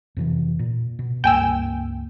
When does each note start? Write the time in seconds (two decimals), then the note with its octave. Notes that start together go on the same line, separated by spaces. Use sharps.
0.17 F2 C3 E3
0.59 A#2
0.99 B2
1.24 C#2 G2 A#3 G5 G#5 E6